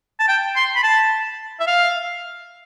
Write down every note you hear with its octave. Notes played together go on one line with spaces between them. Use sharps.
A5
G5
C6
B5
A5
E5
F5